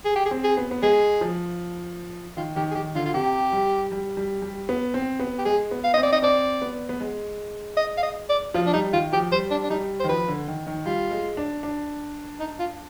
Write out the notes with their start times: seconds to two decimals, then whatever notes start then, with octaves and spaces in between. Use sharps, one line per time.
0.05 G#4
0.15 G4
0.25 G#4
0.31 C4
0.44 G#4
0.57 B3
0.71 B3
0.82 G#3 G#4
1.21 F3
2.36 D#3 F4
2.56 D#3 G4
2.71 G#4
2.75 D#3 G4
2.95 D3 F4
3.06 F4
3.14 C3 G4
3.52 G3
3.92 G3
4.17 G3
4.42 G3
4.69 B3
4.94 C4
5.20 B3
5.38 G4
5.45 G#3 G#4
5.71 B3
5.84 F5
5.94 C4 D#5
6.03 D5
6.12 D#5
6.22 C4 D5
6.62 B3
6.89 B3
7.00 G#3
7.77 D#5
7.98 F5
8.03 D#5
8.29 D5
8.54 F3 F4
8.66 D4
8.73 G3 D#4
8.93 D#3 F4
9.13 F3 G4
9.32 G3 C5
9.51 D4
9.64 D4
9.70 G3 D#4
10.00 C5
10.04 D#3
10.09 F3 B4
10.28 D3
10.48 D#3
10.67 D#3
10.85 G3 F4
11.11 G#3
11.37 D4
11.63 D4
12.40 D#4
12.59 F4